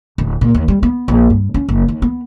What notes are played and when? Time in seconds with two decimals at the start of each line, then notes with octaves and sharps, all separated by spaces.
0.18 D1
0.41 A#2
0.54 D#2
0.68 G3
0.83 B3
1.08 A#1
1.30 G2
1.54 C#4
1.69 F#1
1.88 D#2
2.02 B3